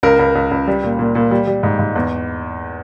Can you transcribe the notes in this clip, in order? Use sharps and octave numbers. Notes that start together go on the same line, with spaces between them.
C#2 A#4
C#2
C#2
C#2
G3
A#2
A#2
A#2
G3
G3
G#2
G#2
E2